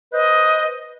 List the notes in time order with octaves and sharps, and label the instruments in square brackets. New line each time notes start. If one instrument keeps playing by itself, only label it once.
[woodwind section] B4 C5 D#5